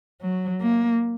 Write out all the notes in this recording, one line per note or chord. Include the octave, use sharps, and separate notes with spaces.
F#3
A#3